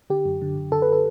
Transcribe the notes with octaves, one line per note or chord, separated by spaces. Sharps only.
D3 G4
F#2
D3
F#2
D3 A4
B4
A4